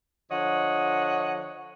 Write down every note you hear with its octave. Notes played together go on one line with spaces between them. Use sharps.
D3 F3 C#5 D#5 F#5